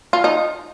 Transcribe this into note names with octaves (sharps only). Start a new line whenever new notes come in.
F4
D#4